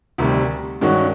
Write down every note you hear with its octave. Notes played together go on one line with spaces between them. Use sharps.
D2 C3 D#3 G3
G2 D#3 G#3 C#4 F#4